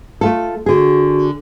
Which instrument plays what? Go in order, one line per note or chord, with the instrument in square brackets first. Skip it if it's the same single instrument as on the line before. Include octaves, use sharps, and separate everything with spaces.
[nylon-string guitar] A3 F4 A4
[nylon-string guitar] D3 G#4 [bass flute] F#4